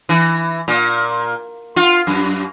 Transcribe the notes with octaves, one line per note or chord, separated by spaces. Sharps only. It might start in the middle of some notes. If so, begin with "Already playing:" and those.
E3
A#2
F4
F#2